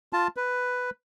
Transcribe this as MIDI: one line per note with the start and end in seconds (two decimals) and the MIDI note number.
0.13 0.28 65
0.13 0.28 81
0.37 0.90 71